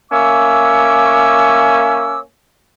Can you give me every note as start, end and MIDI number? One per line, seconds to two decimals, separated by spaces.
0.11 2.18 58
0.11 2.18 61
0.11 2.18 76
0.11 2.18 85
0.11 2.18 86
0.11 2.18 88